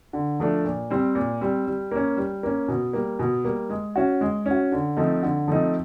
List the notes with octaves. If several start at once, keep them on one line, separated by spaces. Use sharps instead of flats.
D3
F3 A3 D4
A#2
G3 C4
A#2
G3 C4
G3
A#3 C#4
G3
A#3 C#4
B2
G3 A#3
B2
G3 A#3
G#3
C#4 F#4
G#3
C#4
F#4
D3
F3 A3 C4 D#4
D3
F3 A3 C4 D#4